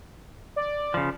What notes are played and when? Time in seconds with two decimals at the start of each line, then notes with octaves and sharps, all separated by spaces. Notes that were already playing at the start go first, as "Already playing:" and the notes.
0.56 D5
0.94 C#3 F3